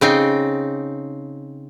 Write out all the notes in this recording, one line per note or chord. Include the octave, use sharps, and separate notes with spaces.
C#3 C4 D#4